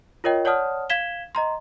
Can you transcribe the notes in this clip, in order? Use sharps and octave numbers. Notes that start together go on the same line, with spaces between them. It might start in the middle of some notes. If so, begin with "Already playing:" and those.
F4 A#4 C#5 D#5 G5
C#5 D5 F#5 A5 D#6 F6
F5 G#6 B6 E7 G7
D#5 A#5 C6